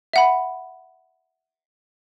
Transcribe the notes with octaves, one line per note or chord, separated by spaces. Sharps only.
E5 F#5 B5